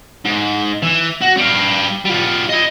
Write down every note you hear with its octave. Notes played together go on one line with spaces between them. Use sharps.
G#2
E3
F#4
G3 F5
G3 F4
E4 D#5